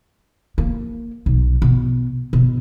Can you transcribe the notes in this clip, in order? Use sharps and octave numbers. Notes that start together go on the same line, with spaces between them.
A#3
B1
B2
B2